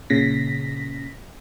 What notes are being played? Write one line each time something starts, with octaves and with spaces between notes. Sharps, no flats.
A#2 C#3 A#6 B6